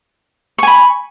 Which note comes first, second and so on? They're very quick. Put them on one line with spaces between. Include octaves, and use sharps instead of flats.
C#6 G#5 B5